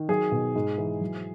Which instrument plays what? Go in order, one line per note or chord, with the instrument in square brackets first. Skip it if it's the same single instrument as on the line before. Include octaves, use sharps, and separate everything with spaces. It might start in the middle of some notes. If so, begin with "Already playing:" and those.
Already playing: [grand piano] D#3
F#3 G#4
B2
G#2
E3
F#3